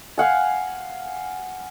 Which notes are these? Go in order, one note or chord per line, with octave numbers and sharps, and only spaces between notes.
F5 F#5 G#5